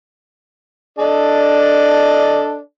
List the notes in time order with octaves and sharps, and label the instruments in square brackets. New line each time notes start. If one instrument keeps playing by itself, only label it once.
[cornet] D4 [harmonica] A4 D5 D#5